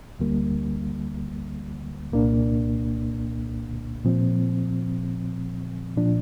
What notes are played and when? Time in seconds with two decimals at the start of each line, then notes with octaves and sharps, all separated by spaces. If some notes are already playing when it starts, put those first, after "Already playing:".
0.19 D2 D3 G3 A#3
2.12 C2 A#2 A#3 D4
4.05 A#2 F3 C4
5.97 A#2 F3 D4